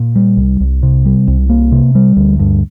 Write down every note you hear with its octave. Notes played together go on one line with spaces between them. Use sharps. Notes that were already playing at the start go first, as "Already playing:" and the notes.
Already playing: A#2
G3
C2
C2
C3
G3
C2
A#3
C3
G3
D2
G2